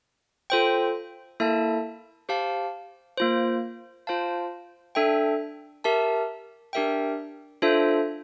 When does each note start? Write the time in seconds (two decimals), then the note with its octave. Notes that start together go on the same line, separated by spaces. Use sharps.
0.50 F4 A4 C5 G5
1.40 A#3 E4 A4 E5 A5
2.29 G4 C5 F5 A5
3.18 A#3 F4 C5
4.07 F4 C5 F5 A5
4.95 D4 A4 E5 G5
5.84 G4 A#4 E5 A5
6.73 D4 G4 A#4 E5 G5
7.62 D4 F4 A4 C5 E5